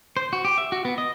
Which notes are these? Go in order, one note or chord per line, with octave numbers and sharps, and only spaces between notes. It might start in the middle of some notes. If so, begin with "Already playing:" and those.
C5
F#4
G4
E5
F#4
B3
D#5